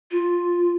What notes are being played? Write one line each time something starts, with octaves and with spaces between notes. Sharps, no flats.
F4